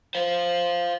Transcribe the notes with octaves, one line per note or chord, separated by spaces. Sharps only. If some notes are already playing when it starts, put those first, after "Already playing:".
C5 F5